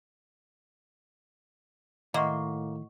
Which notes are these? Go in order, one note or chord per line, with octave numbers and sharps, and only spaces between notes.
A2 D#3 A#3 D#5 E5 F#5 C6 C#6